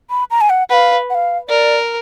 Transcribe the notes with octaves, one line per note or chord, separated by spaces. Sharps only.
B5
A#5
G#5
F#5
B4 F5 F#5
F#5
F5
A#4 D5